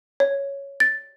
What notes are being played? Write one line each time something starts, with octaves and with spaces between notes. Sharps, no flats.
C#5
A6